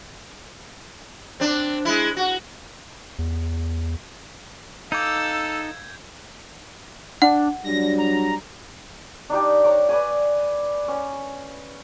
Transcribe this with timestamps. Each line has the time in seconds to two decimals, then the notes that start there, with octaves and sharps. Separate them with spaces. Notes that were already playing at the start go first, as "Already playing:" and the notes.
1.40 C4 D4
1.85 G#3 E4
2.17 F#4
3.19 E2
4.92 D#4 A4 F5 D6 E6 G6 G#6
7.22 D4 F#5
7.64 F#3 G3 D4 A#6
7.98 A#5
9.30 D4 D#4 G4
9.64 C#5 A#5 D6
9.89 B4 D5 G#5
10.88 C#4